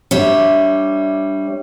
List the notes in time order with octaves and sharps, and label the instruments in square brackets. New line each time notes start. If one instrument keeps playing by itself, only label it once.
[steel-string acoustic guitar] G3 D4 C#5 E5